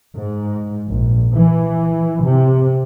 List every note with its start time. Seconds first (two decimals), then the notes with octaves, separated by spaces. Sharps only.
0.15 G#2
0.86 A#1
1.33 E3
2.22 C3